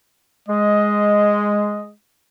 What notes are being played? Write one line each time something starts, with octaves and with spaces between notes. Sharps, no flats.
G#3 D#5